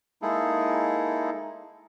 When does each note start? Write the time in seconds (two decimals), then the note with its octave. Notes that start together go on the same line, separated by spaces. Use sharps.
0.22 G#3 A#3 D#4 E4 G#4 A4